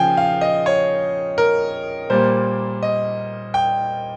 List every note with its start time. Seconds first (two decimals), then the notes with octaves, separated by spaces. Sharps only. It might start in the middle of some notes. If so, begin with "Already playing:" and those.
Already playing: C#3 F3 G5 G#5
0.17 F5
0.41 D#5
0.66 C#5
1.38 A#4
2.10 A#2 G3 A#3 C5
2.83 D#5
3.54 G5